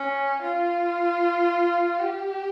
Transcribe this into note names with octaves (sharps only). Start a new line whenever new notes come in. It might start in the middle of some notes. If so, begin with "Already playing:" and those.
Already playing: C#4
F4
G4